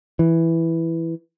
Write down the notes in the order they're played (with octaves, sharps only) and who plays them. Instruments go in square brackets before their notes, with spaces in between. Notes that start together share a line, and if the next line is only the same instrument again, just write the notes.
[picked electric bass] E3